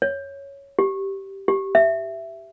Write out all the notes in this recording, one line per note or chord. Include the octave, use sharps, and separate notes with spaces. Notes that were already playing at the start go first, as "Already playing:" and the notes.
C#5
G4
G4
E5